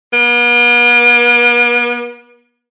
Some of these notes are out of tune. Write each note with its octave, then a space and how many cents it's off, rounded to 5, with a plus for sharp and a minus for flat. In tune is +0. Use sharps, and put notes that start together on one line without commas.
B3 -45